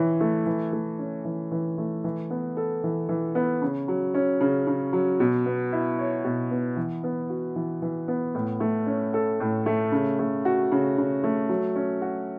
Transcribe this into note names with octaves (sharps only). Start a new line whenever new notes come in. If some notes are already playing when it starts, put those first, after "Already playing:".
Already playing: E3 E4 C#5
A3
E3
A3
C#4
E3
E3
A3
E3
B3
A4
E3
E3
B3
C#3
F#3
C#4
C#3
C#3
F#3
B2
B3
E4
C#5
B2
B3
E3
B3
F#4
E3
E3
B3
A2
A3
C#4
A4
A2
A3
C#3
A3
F#4
C#3
C#3
A3
F#3
C#4
F#4